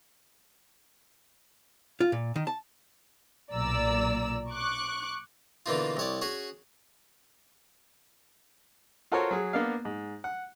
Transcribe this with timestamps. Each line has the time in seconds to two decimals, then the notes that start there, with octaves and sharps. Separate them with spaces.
2.00 F4
2.12 A#2
2.36 D#3
2.47 A5
3.52 B1 A#2 D5 A#5 E6
4.50 C#6 D6 F#6
5.66 B2 D3 E3 A#3 D#4 F4
5.97 C2 C#5 D5
6.21 C#4 F#4 G#4
9.12 F4 F#4 A4 A#4 C5 C#5
9.31 F#3 G#4
9.53 A#3 B3 D4 F5
9.85 G#2
10.24 F#5